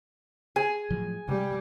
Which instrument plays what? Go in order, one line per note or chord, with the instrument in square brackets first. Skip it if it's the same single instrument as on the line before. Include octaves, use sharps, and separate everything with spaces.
[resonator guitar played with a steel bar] G#4 [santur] G#5
[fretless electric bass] A2 F3 F#3
[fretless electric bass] C3 [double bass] G3